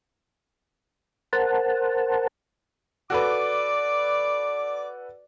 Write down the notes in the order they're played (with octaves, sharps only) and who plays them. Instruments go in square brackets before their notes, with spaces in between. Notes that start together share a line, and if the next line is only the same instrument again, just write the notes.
[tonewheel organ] A#4 C5 F#5 A5
[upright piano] F#4 A4 B4 [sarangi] D5 [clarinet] D6